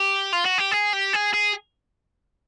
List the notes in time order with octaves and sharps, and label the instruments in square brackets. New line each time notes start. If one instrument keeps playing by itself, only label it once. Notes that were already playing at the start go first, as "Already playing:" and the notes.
Already playing: [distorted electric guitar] G4
F4
F#4
G4
G#4
G4
G#4
G#4